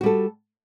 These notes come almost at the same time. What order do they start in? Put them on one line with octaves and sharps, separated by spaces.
F#4 G3 A4